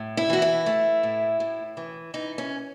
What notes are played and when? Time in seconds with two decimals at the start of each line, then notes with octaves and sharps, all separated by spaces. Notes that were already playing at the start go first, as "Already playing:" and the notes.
Already playing: A2
0.17 E4
0.30 E3 F#4
0.42 E4
0.66 A3
1.03 A2
1.40 A2
1.77 E3
2.14 E3 D#4
2.38 C#4